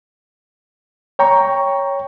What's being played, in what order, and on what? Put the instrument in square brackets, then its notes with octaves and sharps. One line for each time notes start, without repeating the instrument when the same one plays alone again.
[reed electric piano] C#5 G5 A#5 C#6